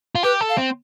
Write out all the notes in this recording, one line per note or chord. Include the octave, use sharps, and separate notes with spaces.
F4
G4 B4
A4
F5
C4